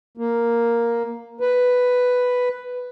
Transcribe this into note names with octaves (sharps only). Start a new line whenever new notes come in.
A#3
B4